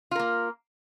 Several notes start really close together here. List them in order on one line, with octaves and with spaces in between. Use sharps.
F4 A#4 A#3